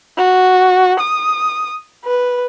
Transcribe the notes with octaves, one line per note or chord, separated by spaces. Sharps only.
F#4
D#6
B4